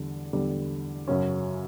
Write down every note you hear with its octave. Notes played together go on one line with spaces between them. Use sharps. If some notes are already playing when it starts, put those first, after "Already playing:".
Already playing: E2 D3 G3
E2 D3 G3
F#2 C#3 F#3 C#4